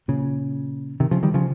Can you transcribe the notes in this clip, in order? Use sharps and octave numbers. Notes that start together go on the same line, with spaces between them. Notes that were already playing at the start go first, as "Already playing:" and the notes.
A#2 C#3
C3 D#3
C#3 F3
D#3 G3
C#3 F3